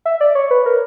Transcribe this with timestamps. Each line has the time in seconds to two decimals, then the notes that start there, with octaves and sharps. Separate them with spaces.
0.06 E5
0.21 D5
0.35 C#5
0.51 B4
0.66 A#4